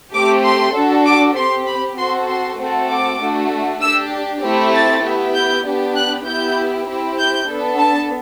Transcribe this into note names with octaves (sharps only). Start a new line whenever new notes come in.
A3 C4 G4 D6
C6
D4 F#4 A4
D6
C4 G4 C6
B5
C4 F#4 A4 C6
C6
A3 C4 F#4 A4
D6
A3 D4 F#4
D4 G4 E6
A3 C4 E4 G4
A6
B3 E4 G4
G6
B3 D4 G4
F#6
B3 E4 G4 G6
C4 E4 G4
G6
B3 D4 A4
A5